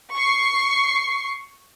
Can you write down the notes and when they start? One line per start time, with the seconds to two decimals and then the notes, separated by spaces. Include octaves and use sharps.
0.14 C#6 C7